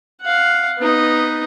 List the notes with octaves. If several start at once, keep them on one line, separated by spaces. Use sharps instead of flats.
F5 F#5
B3 D#4